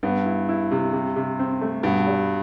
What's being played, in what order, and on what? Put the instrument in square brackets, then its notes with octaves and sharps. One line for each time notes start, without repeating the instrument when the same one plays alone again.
[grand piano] G2 [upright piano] B3
[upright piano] E4
E4
C3
C3
C3
C4
A3
[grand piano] G2 [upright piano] B2
[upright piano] G3